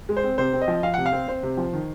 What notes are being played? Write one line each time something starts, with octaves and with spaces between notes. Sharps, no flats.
G#3
C5
C4
C3 C5
C4
D#5
F3
F3 F5
C3 F#5
F5
C4
C4 C5
C3
F3
D#3